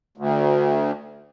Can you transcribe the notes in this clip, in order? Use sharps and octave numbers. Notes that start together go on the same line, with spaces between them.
D2